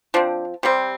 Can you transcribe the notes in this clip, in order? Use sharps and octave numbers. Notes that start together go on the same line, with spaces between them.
F3 C4 D4
C3 G3 C4